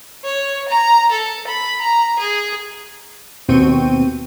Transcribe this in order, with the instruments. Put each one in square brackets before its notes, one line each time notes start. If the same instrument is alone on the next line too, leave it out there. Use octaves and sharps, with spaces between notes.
[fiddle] C#5
A#5
A4
B5
A#5
G#4
[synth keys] D#2 B2 C4 G5 C#6 D#7